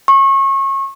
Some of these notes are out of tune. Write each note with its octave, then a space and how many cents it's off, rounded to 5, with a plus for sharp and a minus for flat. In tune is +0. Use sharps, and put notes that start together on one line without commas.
C#6 -30